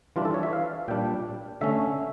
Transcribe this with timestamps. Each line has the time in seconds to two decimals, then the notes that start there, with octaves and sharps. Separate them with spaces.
0.16 E3 G3 D4 F4
0.25 A4
0.34 C#5
0.43 E5
0.53 F5
0.88 A#2 G3 D4 G5
1.61 D3 A3 C#4 E5